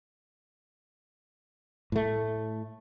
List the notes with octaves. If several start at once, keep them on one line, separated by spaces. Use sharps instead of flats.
A2 A3